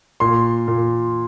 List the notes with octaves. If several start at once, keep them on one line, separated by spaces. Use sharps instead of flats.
A#2 C6
A#2